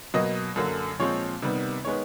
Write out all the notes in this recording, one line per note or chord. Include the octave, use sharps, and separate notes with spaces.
B2 F#3 A#3 D#5
F#2 D3 F#3 A#3
A#2 F3 G#3 C4 C#5
C3 D#3 G3 B3
D#3 G#3 B3 C#5